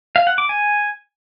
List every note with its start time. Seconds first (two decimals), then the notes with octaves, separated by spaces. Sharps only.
0.16 F5
0.27 F#5
0.38 D6
0.49 G#5